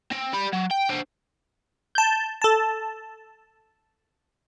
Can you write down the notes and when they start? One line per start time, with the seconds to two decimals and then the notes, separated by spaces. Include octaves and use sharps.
0.12 C4
0.34 G3 B5
0.53 F#3
0.71 G5
0.89 D4 C5
1.95 A5 G6
2.42 A4 A5